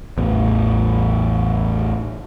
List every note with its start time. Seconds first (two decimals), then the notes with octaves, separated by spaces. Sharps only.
0.18 A1 E2